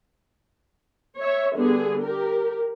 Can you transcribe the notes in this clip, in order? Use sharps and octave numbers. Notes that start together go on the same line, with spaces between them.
C#5 E5
D3 G3 B3 G#4
G4 A#4